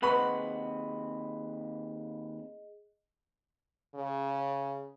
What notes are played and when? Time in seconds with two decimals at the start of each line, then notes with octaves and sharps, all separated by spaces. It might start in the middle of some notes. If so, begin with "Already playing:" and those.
0.02 D#2 C4 G#4 B4 D#5 F#5 B5 C#6
3.95 C#3